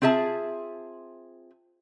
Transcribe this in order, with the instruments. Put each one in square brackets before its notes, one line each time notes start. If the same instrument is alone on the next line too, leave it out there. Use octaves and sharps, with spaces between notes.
[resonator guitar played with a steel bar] C4 F4 G#4 E5 A5